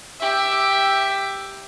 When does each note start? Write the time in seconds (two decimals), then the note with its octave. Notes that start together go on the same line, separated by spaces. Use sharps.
0.20 G4 E5